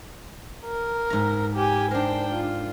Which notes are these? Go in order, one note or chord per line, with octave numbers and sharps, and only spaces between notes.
A#4
G#2 A#5
G4 G#5
D4 A#4 C5 G5
F4